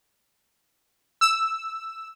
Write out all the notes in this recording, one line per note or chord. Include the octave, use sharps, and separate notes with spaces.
E6